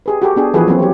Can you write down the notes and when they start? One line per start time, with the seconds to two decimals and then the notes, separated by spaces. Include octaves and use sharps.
0.06 G4 G#4 B4
0.22 F#4 G4 A4
0.36 B3 D4 G#4
0.54 E3 F3 F#4 G#4 A4 B4
0.68 F#3 A#3 C4 E4
0.79 G4 C#5